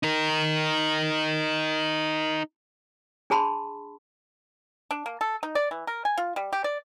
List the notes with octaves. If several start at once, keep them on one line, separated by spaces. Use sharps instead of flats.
D#4 A#4
D4 G#4 A5 B5 C6
D4
A#3
A4
D#4
D5
E3
A#4
G#5
F4
G3
G4
D5